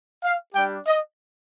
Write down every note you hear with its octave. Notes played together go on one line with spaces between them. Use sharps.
F5
G3 D4 G4 G5
D#5